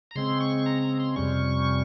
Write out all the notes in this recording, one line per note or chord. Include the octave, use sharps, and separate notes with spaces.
A#5
C#3 G#3 C4 C6
C#6
A#5
A#5
C6
F2 C3 G3 C#4 C#6